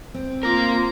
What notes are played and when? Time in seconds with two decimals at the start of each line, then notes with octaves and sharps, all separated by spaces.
0.14 C4
0.43 A#3 F4 A#4 A#5